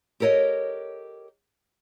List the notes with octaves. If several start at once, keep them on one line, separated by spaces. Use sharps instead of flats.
G4 A4 A#4 C#5 D#5